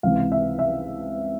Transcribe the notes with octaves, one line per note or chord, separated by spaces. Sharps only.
C#2 C3 E3 F5
E5
E5